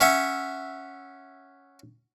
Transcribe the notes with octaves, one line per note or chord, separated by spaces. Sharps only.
C#4 C#5 E5 F#5